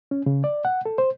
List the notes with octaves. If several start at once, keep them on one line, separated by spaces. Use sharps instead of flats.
C#4
C#3
D5
F#5
A4
C5